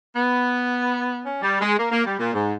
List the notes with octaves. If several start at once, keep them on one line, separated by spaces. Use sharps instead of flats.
B3
C#4
G3
G#3
A#3
A#3
G3
A#2
G#2